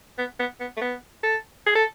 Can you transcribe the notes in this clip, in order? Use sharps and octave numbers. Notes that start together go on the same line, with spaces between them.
B3
B3
B3
A3
B3
A4
G#4
A4